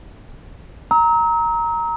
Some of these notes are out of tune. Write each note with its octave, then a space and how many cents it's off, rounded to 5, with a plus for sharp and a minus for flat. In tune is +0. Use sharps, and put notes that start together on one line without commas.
A#5 +0 E6 -45